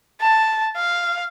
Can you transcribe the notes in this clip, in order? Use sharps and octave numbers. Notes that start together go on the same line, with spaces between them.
A5
F5